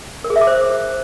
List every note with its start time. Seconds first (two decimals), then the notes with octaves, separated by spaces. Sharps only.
0.24 A#4
0.30 G#4
0.36 E5
0.41 D6
0.47 C5